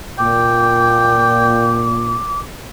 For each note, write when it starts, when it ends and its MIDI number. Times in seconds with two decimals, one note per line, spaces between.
0.19 2.18 46
0.19 1.90 79
0.19 2.40 86